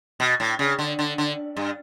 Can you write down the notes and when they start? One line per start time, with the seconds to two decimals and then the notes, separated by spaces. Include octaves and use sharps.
0.20 B2
0.40 A2
0.59 C#3
0.79 D3
0.99 D3
1.18 D3
1.57 G2